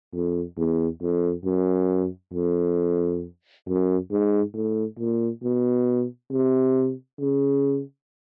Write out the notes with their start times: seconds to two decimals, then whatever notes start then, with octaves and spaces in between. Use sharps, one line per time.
0.12 F2
0.57 E2
1.01 F2
1.45 F#2
2.33 F2
3.67 F#2
4.11 G#2
4.54 A2
4.98 A#2
5.43 B2
6.31 C3
7.19 C#3